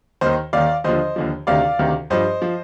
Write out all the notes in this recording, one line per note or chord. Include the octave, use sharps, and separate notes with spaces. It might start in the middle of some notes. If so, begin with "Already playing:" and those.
D#2 D#3 C5 D#5
D#2 D#3 D5 F5
D#2 D3 F3 C5 D#5
D#2 D3 F3
D2 C3 D#3 D5 F5
D2 C3 D#3
G2 F3 C5 D#5
F3